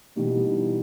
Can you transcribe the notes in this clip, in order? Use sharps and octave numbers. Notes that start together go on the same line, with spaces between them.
B2 E3 G3 D#4